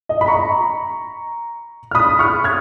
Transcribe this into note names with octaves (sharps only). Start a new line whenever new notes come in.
D#5
B5
A#5 C#6
F6
B5 D#6
C#6 F6
F6 G#6